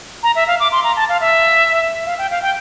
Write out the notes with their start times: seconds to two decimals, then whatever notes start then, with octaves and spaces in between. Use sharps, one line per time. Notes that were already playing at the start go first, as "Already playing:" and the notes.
0.23 A#5
0.36 E5
0.47 F5
0.60 D6
0.72 C6
0.84 A#5
0.96 A5
1.09 F5
1.20 E5
2.06 F5
2.18 G5
2.31 F5
2.42 G5